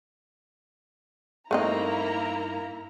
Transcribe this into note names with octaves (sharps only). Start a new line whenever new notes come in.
G2 A3 A#3 C4 D#4 E4 D#5 A#5